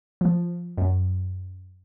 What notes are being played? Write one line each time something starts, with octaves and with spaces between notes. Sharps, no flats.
F3
F#2